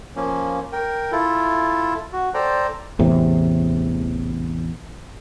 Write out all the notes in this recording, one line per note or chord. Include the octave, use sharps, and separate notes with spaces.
F3 A#3 C#4
A#4 G5
E4 F4 A4
F#4
A4 C5 D5 G5 A#5
A1 E2 A2 C3